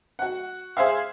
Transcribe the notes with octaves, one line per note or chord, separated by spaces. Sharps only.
F#4 F#5
G#4 C5 E5 F5